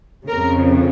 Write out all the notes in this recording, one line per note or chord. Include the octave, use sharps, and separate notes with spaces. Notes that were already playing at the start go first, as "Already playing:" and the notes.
F2 C#3 A#4